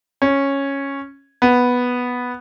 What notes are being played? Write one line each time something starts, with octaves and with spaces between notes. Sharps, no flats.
C#4
B3